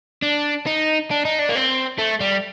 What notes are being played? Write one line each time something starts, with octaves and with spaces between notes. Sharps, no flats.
D4
D#4
D4
D#4
D4
A#3
C4
A3
G3